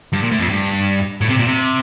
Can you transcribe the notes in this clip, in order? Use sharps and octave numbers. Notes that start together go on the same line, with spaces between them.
G2
A#2
A2
F2
G2
A2
C3
A#2
C3